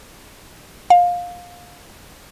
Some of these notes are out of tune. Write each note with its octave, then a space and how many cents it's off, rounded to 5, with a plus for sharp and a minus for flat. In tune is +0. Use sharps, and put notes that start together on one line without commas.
F5 +20